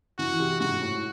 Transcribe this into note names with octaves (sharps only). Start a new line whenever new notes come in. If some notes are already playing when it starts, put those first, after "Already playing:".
E3 F#4
C3
G#2 F#4
A2